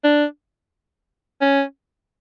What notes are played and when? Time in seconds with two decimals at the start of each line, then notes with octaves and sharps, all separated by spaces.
0.04 D4
1.41 C#4